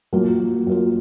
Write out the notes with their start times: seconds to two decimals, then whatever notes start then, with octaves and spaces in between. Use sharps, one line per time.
0.13 F#3 A#3 F4
0.67 F#3 A#3 F4